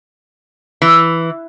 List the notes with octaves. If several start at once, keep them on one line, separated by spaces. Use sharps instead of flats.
E3